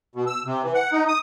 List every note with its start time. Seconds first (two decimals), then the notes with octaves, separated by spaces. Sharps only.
0.16 B2
0.27 E6
0.46 C3
0.63 E3
0.74 F#5
0.92 D#4
1.08 D#6